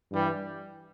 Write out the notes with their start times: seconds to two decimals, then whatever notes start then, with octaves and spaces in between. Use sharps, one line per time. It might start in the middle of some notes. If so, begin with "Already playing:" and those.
0.10 G2 E3 G3